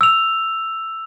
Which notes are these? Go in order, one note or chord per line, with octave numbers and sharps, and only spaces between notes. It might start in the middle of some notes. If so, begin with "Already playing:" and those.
E6 F7